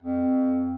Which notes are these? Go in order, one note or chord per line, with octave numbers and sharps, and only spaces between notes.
F2